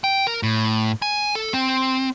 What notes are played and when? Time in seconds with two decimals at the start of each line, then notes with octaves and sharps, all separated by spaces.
0.04 G5
0.27 A#4
0.43 A2
1.02 G#5
1.35 A4
1.54 C4